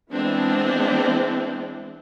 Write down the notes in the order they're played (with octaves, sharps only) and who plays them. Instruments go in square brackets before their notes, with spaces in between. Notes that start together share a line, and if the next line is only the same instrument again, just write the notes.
[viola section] E3 G#3 B3 C4 D4 E4